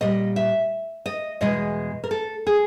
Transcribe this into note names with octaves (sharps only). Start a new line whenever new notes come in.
A#2 G3 D#5
E5
D#5
E2 B2 G#3 D#5
A#4
A4
G#4